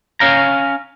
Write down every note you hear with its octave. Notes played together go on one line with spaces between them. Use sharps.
C#4 F5 A#5